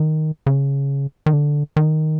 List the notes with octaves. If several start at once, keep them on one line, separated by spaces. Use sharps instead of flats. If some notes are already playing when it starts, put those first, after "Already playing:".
Already playing: D#3
C#3
D#3
D3
D#3